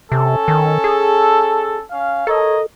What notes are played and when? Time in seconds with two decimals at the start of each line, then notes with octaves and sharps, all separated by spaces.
0.12 C3 C#4 A4
0.48 D#3
0.84 G#4
1.91 C#4 F5
2.27 A4 A#4 C#5 D#5